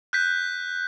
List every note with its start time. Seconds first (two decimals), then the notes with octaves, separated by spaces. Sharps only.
0.13 F#6 G6 B6